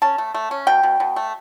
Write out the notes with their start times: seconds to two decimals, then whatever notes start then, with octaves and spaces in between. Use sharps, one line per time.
0.02 C#4 A5
0.18 A3
0.34 A3
0.51 C#4
0.67 B2 G5
0.83 B2
1.00 B2
1.16 A3